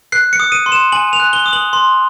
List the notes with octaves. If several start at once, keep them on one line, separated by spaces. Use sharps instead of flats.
F#6 C7
C#7
D#6
D#7
C6
E7
G#5 F#7
F7
F#6
G7
D#6
F#7
C6